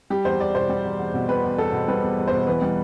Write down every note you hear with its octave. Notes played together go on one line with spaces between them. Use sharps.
G3 G4
E2 C5
E2 D5
B2 C5
G3
E2
E2
B2
G3 B4
E2
E2 A4
B2
G3 B4
E2
E2
B2 C5
E3 B4
G3